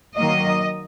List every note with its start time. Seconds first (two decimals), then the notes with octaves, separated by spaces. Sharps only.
0.16 D#3 F#3 A#3 D#5